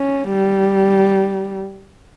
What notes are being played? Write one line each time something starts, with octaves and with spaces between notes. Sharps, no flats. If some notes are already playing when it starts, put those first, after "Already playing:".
Already playing: C#4
G3